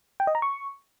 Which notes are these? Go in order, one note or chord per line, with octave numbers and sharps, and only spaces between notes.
G5
D#5
A#5
C#6